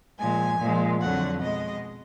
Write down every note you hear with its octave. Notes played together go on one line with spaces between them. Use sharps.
A#2 F3 G#3 G#5
A#2 F3 G#3
F2 D3 F#3 F#5
B2 G#3 D#5